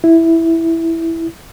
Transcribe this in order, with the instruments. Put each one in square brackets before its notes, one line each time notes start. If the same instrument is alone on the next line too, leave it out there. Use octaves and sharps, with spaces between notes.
[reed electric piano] E4